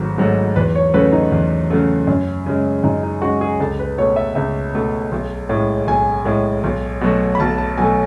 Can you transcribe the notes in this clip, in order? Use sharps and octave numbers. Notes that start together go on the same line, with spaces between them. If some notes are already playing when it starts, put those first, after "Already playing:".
Already playing: G#1 G#2 F#3 A3
G#2 F#3 A3
E2 B4
C#5
C#3 F#3 A3 B4
D#4
E2
C#3 F#3 A3
F#2
C#3 G#3
F#2 D#4
D#4
C#3 G#3 F#4
G#4
C#2 A4
B4
B2 A3 C#5
E5
C#2 E5
B2 A3
B1
A2 G#3
B1 G#5
A2 G#3
B1
B2 F#3 A3
B5
B1 A5
A5
B2 F#3 A3 G#5